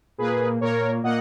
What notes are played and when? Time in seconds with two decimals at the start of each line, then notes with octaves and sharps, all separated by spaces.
0.18 A#2 A#3 G#4 B4
0.61 A#2 A#3 A#4 C#5
1.03 A#2 A#3 D#5 F#5